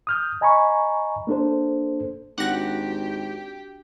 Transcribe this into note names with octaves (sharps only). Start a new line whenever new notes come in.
D#6 F6 G6
D#5 G#5 A#5 B5 C#6
A#3 D4 A4 C5
G#1 D4 F#4 G4 F#5 A#6